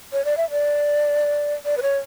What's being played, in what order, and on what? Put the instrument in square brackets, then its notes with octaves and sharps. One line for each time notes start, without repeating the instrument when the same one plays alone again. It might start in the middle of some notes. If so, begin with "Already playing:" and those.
[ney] C#5
D5
E5
D5
D5
B4
C#5